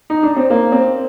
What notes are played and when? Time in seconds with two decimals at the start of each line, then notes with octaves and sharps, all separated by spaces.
0.10 D#4
0.23 D4
0.36 C4
0.50 A#3
0.72 C4